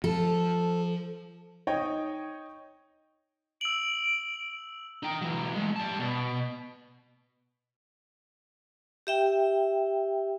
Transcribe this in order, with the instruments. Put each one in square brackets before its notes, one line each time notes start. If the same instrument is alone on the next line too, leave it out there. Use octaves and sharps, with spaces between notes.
[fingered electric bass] F3 [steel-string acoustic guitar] A4
[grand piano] D#4 C#5 D#5 G5 C#6
[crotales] E6 F#7 [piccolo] D7
[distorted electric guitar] D#4 G5
E3 F#3
G#3 A3
G3 A5
B2
[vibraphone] G4 E5 G5